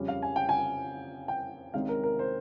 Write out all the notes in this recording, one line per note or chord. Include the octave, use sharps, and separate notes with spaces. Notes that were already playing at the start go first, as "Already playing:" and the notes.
Already playing: F2 C#3 G3 C#4
F5
G#5
G5
G#5
G5
C2 C3 D#3 G#3 C#4 F5
A#4
A#4
C5